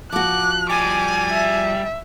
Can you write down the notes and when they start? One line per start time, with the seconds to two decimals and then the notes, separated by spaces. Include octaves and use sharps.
0.12 F3 F#4 D6 F#6
0.70 G3 G#4 G#5 D6
1.32 E5